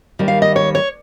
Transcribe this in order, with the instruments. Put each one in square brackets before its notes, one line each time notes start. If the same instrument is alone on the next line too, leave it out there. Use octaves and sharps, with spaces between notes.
[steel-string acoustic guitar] D#2 D#3 G3
F5
D#5
C#5
C#5